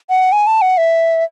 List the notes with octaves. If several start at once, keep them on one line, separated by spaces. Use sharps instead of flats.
F#5
G#5
A5
F#5
E5